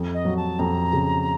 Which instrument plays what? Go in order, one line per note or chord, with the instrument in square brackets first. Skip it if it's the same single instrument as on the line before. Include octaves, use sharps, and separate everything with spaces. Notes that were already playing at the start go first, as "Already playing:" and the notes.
Already playing: [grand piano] F2
[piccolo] D#5
[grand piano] F#3
[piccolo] A5
[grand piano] F2 [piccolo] A#5
[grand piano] C#3